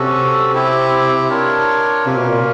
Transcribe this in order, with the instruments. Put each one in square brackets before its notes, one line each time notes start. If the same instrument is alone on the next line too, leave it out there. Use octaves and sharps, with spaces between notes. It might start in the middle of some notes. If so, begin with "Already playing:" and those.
Already playing: [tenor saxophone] C3 [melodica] C#4 F#4 A4
[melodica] C4 E4 G4
D4 F4 A#4 C#5
[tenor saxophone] C3 [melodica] A#3 C#4 F4 A#4
[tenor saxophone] B2
A#2